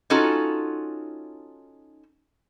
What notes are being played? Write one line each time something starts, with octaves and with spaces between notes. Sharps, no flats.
C#4 D#4 F4 F#4 A4